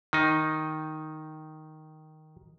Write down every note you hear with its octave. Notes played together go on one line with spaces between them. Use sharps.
D#3 D#4